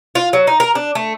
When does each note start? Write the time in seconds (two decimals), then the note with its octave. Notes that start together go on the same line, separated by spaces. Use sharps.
0.15 F4
0.33 F#3
0.47 D#4
0.60 A#4
0.75 D4
0.95 A3